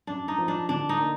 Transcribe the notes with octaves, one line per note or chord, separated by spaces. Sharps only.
F#2 D4
D#4
F3
D4
D3 D4
D#4
A#3